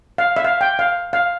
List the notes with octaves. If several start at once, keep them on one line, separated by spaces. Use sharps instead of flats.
F5
E5
F5
G5
F5
F5